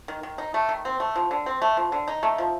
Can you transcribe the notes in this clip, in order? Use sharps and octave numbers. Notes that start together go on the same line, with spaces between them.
D#3
D#3
D#4
A3
D#3
C4
A3
F3
D3
C4
A3
F3
D3
D#4
A3
F3